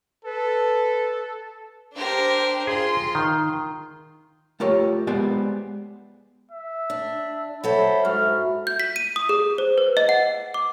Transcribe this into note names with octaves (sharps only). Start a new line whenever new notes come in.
A4 B4
D4 G4 A#4 C5
F4 G#4 C6
D#3
A3 F4 G4 A#4 C#5
G#3 B3 G4 C5 D5 G#5
E5
D4
F#3 E4 A4 C5 B5
G#2 E4 F#4 F6
G6
B6
D#7
D#6
G#4
C5
B4
D#5
F#5
D6